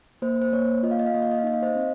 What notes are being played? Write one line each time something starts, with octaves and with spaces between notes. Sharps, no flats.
A#3 C5
C5
A#3 C#5
F4 D#5
F5
D#5
F5
A#3 D#5
F5
D#5
F5
D#4 D#5
F5
C5 D#5
C4